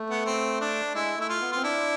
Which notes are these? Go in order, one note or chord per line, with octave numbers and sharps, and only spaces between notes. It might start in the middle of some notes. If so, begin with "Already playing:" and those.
Already playing: A3
B3
C4
D4
G#3 E4
A3 E4
F4
B3
C4 F4
D4 E4